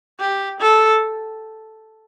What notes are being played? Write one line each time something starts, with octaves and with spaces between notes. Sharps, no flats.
G4
A4